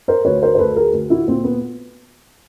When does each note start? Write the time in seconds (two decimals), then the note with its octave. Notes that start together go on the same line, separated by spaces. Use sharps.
0.08 A#4 C5
0.25 D2 B4 C#5
0.43 A#4 C5
0.55 C5
0.59 D2 A4 B4
0.76 G#4 A#4
0.93 D2
1.10 E4 F#4
1.28 A#2 C4
1.44 B3